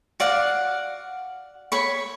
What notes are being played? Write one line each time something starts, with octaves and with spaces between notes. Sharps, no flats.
F#4 D5 F5 F#5
C#5 B5 C#6